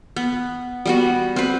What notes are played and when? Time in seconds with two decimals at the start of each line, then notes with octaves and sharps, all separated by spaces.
0.16 B3
0.86 G3 B3 F#4
1.36 C4 B4